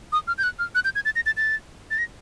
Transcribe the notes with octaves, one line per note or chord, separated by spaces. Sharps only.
D#6
F6
G6
F#6
F6
F#6
G6
G#6
A6
A#6
A6
A6
A6
A#6